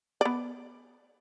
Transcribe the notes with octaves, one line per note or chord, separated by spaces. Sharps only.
B3 D5